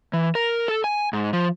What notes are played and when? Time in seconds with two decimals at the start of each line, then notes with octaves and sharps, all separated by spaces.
0.13 E3
0.35 A#4
0.68 A4
0.84 G#5
1.13 G#2
1.33 F3